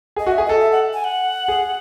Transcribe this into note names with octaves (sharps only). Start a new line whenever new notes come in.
G#4
D#5
F#4
E5
G#4
A4 D#5
E5
F#5
G#5
F#5
G#4